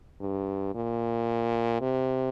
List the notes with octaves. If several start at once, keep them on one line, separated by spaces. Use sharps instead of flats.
G2
A#2
C3